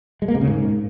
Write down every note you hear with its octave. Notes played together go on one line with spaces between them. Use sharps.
G#3
A#3
C3
C#3
G#2